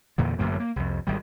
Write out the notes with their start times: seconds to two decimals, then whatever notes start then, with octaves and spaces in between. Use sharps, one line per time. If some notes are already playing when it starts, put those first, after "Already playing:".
0.18 E2 A#2 D3
0.39 A1 F#2 D3 A#3
0.60 A#3
0.76 C2 F2
1.07 G#1 D#3 G3